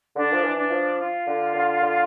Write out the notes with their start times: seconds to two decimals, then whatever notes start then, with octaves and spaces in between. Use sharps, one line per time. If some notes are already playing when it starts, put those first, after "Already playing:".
0.16 D3 D4
0.33 F3
0.44 E3
0.57 D4
0.71 F3
0.99 F4
1.27 D3
1.54 D3
1.82 D3